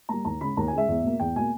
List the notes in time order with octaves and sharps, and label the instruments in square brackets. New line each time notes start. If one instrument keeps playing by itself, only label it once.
[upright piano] G3 A#3 A#5
D#2 A#5
C#3 G#3 B5
D#2 A#5
G#5
C#3 G#3 E5
E2
B2 A#3
E2 G5
B2 A#3 G#5